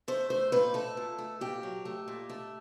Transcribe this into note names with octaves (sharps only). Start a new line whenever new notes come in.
A3 C5
A3 C5
A#2 B4
A3 A4
A#2
A3
A#2 G4
F#3
A3
A#2
A3